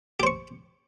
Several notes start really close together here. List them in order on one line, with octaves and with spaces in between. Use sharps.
G4 C5 C#6